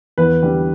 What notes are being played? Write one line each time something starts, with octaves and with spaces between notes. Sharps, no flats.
E2 B4
D3 G3